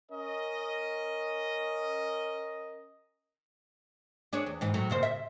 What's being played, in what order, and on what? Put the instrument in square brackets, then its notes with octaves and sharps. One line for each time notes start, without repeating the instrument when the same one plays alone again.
[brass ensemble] C#4 A#4 D#5
[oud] D4 G#4 C#5
E2
G#2 E3
A2 F#3
A#2 C#3 C5
E5